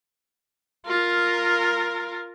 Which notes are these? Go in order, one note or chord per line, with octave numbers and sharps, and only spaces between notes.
F4 A#4